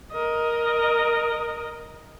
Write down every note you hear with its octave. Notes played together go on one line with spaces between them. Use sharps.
A#4 D#5